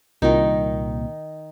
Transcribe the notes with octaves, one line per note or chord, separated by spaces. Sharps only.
C2 A#2 D#3 D#4